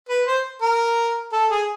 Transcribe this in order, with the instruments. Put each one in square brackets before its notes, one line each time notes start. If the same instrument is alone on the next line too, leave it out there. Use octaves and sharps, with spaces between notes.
[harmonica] B4
C5
A#4
A4
G#4